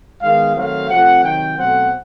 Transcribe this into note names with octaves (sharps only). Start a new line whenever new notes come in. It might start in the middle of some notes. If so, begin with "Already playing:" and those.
D#3 G#3 B3 F5
D#3 F#3 A3 C4 F5
C3 F3 A3 C4 F#5
C3 D#3 F#3 G5
B2 F#3 A3 C4 F#5